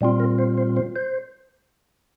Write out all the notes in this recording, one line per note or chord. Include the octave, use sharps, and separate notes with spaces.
A#2 G3 C4 F4
A#4
C5
C5
C5
C5